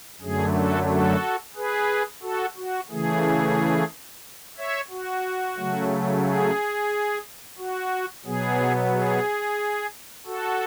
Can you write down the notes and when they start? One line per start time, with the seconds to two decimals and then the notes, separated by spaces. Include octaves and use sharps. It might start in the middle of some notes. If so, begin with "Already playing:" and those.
0.22 F#2 D3 F#3 A3 G#4
0.55 F#4 A4
0.89 F#4 A4
1.56 G#4 B4
2.22 F#4 A4
2.57 F#4
2.90 C#3 E3 A3 G#4
4.57 C#5 E5
4.90 F#4
5.57 C#3 F#3 A3
6.24 G#4
7.58 F#4
8.26 B2 F#3 B3 G#4
8.93 G#4
10.26 F#4 A4